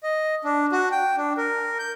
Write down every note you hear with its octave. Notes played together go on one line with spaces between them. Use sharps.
D#5
D4
F#4
G5
D4
A#4
G6